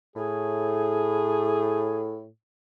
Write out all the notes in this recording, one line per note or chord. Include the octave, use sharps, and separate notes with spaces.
A2 G#4